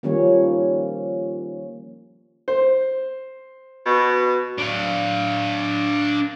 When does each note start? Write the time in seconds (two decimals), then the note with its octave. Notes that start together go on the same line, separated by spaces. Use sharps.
0.03 D#3 F3 G3 A#3 C#4 C#5
2.48 C5
3.86 B2
4.58 D4 F5